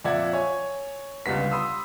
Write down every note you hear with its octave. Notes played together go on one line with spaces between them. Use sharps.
F2 A#2 D5 E5 F#5 G#6
C#5 G#5
G1 C#2 G3 B3 B6
B5 C6 D#6 E6